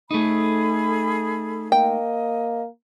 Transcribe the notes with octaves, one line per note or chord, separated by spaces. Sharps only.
A3 D#4 G#4 A4 B5
A#3 D#5 G5